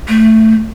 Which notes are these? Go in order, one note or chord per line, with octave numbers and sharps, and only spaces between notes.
A3